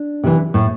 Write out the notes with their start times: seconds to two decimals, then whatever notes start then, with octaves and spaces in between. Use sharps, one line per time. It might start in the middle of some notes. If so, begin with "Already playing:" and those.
Already playing: D4
0.24 C3 E3
0.54 A2